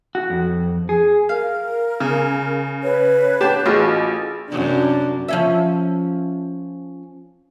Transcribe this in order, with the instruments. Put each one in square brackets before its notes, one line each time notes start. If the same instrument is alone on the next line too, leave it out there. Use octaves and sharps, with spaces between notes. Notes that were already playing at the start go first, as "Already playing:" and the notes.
[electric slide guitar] F#4
F2
G#4
[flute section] A#4 [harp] F5
[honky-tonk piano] C#3 [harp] G#5
[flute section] B4 C#5
[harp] D4 F#5 A5 [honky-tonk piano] G4
[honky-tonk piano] A1 [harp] F4 F#4 G#4
[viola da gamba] F#2 C3 [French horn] D4
[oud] F3 C#4 E5